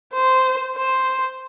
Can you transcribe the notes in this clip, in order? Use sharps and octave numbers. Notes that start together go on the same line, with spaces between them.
C5
C5